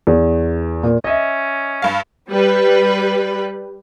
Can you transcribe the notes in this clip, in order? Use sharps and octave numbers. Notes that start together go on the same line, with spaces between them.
E2
A#2
C#4 D#5 E5
G2 F5
G3 B4